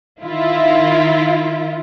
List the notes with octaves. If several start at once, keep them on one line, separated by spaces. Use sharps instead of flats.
D#3 E4 F4